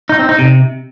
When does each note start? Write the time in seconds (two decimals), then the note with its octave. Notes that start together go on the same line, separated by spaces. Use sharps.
0.09 D#4
0.19 C4
0.29 D#4
0.39 C3